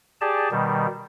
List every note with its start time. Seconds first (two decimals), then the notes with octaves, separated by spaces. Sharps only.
0.21 G4 G#4 D5 A5
0.51 B2 D#3 G3